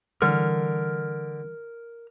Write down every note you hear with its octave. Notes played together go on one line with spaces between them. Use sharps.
D3 E3 G3 A#4 F6